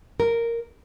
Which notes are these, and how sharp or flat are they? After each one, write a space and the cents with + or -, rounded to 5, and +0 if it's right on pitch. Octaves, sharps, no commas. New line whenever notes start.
A#4 -5